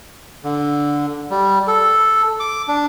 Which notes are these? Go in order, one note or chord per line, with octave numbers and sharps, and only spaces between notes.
D3
G3
A4
D6
D4